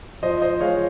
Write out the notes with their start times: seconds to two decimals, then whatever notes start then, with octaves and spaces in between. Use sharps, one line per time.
0.23 F3 C5 D#5
0.42 C5 D#5
0.60 G#3 C#5 F5